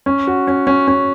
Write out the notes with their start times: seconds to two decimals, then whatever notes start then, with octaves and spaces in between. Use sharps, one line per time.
0.06 C#4
0.27 F#4
0.47 C#4
0.67 C#4
0.88 C#4